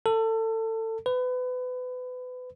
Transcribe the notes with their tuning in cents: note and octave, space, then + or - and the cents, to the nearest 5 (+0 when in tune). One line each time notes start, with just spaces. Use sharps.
A4 +25
B4 +30